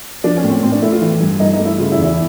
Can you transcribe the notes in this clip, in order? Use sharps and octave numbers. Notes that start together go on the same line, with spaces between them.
F3 D4
C#4
A2
C4
A2 C4
D4
A3 E4
F4
E3
G2
G2 D#4
D#4
A3
E4
C#3 F4
E4
E2
E4